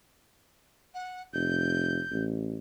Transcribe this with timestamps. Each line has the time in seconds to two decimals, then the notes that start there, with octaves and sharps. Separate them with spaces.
0.94 F#5
1.33 F1 G6
2.11 A1